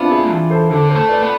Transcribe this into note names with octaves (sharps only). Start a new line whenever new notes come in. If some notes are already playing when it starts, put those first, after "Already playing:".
Already playing: B3 C4 D4 E4 F4
E4 G#4
E3
A4 C5
D3 A4 C5
A4 C5
A3
B4 D5
B3